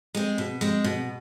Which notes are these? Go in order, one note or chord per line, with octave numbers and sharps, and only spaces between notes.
G#3 C4
B2
G#3 C4
B2